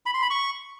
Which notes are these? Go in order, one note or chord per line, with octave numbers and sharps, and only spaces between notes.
B5
C6
B5
C#6